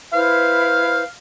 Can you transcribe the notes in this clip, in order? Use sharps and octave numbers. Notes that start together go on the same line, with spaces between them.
E4 B4 C5 F5